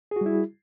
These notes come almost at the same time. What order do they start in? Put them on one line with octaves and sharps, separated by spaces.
G#4 F#4 G3 E4